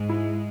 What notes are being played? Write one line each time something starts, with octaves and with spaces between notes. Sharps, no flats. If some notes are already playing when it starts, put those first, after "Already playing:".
Already playing: G#2 G#3
E4